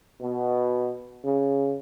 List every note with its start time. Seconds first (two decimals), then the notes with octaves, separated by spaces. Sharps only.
0.20 B2
1.24 C#3